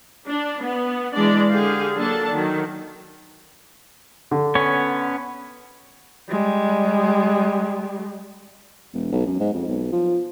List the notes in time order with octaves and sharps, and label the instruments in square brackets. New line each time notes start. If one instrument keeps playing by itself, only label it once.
[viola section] D4
B3
E3 G#3 D4 D5
D3 G4 G#4 F5
F#3 A#3 D4 A4 A5
D#3 F#3
[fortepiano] D3
[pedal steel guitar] B3 C#4 C#5
[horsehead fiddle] G3 G#3
[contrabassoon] E1
B1
F#2
G#2
F2
B1
F3